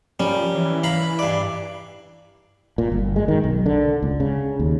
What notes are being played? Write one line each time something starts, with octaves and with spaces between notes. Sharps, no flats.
F3 G3 C#4 A#4
E3
E4 F5 A#5 B5
G2 D5
A#2
G1
G#3
D#3
B1
D3
C#2
C#3
D#2